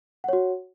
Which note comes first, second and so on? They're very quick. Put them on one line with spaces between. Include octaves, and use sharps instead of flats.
F#5 C#5 F#4